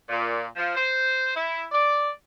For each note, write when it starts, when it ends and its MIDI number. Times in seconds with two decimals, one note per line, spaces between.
0.09 0.44 46
0.56 0.74 53
0.74 1.32 72
1.35 1.63 64
1.72 2.09 74